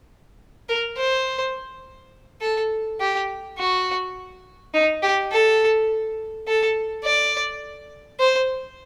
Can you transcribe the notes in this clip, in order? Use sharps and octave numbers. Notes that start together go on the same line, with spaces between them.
A#4
C5
A4
G4
F#4
D#4
G4
A4
A4
D5
C5